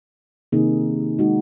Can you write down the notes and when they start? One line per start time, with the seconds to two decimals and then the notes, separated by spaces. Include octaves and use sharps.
0.52 C3 D#3 A#3 D#4 G#4
1.19 G#3 D#4 F#4